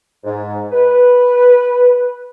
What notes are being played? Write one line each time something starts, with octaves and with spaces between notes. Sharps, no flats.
G#2
B4